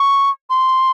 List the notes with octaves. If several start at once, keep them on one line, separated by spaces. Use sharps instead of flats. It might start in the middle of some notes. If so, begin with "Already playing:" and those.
Already playing: C#6
C6